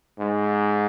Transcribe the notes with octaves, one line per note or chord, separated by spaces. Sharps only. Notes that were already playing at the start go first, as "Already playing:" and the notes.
G#2